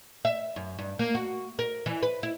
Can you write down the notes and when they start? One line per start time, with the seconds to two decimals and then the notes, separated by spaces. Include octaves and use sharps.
0.25 E5
0.56 F#2
0.79 G2
0.99 A#3
1.15 F#4
1.59 A#4
1.86 E3
2.03 B4
2.23 E4